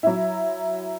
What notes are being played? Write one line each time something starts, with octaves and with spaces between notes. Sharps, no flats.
F#3 E4